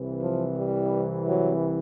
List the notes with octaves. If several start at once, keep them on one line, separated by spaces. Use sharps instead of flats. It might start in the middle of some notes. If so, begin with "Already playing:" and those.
Already playing: C2 C3 E3
F3
G3
F#3